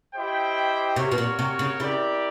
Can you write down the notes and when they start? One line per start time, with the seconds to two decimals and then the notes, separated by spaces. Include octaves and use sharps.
0.13 E4 G4 C5 D#5 G5
0.96 C3 F#4 A#4 C#5
1.12 B2
1.18 A#2
1.39 C3
1.59 C#3
1.80 C#3 E4 G4 A#4 D5